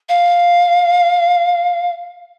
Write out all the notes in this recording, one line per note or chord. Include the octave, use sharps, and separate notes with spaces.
F5